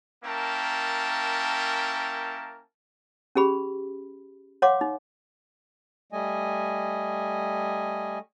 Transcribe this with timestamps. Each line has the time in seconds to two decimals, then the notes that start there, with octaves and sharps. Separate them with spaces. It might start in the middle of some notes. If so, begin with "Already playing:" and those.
0.24 A#3 C#4 E4 A#4 G5 A5
3.35 C#4 G4 G#4 B5
4.62 C#5 F5 F#5 C6 D6
4.81 D#4
6.12 G3 A3 D#5 G#5